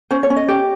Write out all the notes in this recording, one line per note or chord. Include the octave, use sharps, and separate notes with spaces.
C#4 C5
C#5
C#4
D#5
G4